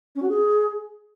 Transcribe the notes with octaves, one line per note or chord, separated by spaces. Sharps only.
C#4
F#4
G#4